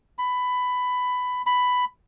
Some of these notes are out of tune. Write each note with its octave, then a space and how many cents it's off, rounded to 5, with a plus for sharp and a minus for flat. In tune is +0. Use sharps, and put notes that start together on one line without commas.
B5 +15
B5 +10